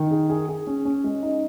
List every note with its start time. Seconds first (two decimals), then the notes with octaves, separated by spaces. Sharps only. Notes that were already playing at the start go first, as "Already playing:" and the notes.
Already playing: D#3
0.11 G#4
0.30 G#4
0.48 G#4
0.67 C#4
0.85 C#4
1.04 G#3
1.23 D#4